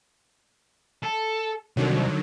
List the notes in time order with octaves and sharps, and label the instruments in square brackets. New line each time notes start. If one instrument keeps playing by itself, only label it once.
[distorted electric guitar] A4
[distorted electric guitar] C2 [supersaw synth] D3 D#3 F#3